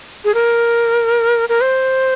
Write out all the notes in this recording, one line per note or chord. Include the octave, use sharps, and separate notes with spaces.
G#4
A#4
A#4
C5